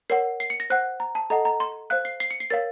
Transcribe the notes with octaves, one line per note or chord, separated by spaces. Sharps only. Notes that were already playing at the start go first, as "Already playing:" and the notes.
A#4 C#5 F#5 C7
C7
C#7
A#6
C5 F#5 F#6
A#5
A5
A4 D#5 F#5 A#5
A#5
C6
C5 F5 F#6
C7
C7
C#7
C7
A#4 C#5 F5 A6